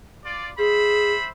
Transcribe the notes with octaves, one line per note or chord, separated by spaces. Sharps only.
F4 D5
G#4 C5 E5 B5